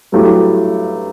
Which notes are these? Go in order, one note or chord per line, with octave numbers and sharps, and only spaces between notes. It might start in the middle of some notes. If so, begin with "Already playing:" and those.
G2 F#3 A3 E4 G4